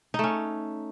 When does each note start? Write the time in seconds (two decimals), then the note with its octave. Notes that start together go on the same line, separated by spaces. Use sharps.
0.14 D#4
0.19 A3
0.24 C#4